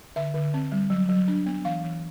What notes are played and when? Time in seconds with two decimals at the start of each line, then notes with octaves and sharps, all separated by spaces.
0.16 D3 E5
0.34 D3
0.54 C4
0.72 G3
0.90 F#3
1.09 F#3
1.28 D4
1.46 B3
1.65 E3 F5
1.84 E3